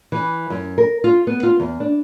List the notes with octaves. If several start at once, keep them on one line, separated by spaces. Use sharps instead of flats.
E3
F#2
A#4
F4
B3
F4
E2
D4